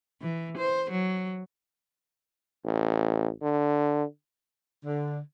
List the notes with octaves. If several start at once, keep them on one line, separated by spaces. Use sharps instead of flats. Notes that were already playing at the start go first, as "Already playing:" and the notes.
E3
C5
F#3
A1
D3
D3